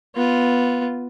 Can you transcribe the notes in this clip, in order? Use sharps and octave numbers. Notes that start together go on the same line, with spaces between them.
B3 F4